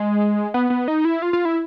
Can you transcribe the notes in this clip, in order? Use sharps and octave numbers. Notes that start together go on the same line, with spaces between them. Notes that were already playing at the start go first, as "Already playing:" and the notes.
Already playing: G#3
B3
B3
D#4
E4
F4
F4
E4